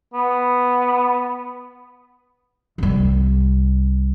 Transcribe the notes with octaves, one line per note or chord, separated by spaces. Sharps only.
B3
C2 G3